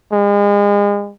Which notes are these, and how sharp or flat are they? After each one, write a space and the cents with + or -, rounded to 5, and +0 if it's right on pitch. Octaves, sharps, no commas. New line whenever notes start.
G#3 -35